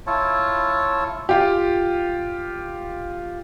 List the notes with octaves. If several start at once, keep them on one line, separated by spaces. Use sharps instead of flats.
E4 F4 C#5 A5
F4 G4